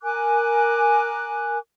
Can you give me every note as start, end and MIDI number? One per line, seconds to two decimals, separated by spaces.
0.03 1.58 70
0.03 1.58 80
0.03 1.58 86
0.03 1.58 90